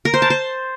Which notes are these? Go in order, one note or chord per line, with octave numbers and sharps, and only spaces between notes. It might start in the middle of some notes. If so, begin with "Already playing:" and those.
A#4
C5
A5
C5